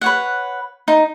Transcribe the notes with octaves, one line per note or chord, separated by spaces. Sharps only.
B4 C#5 F#5
D#4